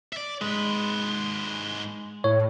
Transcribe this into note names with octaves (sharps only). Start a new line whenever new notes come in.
D5 E5
G#2 G#3 B4
A2 C#5